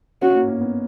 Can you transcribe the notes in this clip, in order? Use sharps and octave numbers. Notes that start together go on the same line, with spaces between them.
C#4 F#4
A#3
A#3
B3